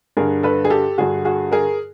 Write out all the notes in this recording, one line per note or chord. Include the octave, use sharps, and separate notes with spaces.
G2 D3 G#4 A#4
A4 B4
G#4
G4 A4
G2 D3 F#4 G#4
F#4 G#4
G#4 A#4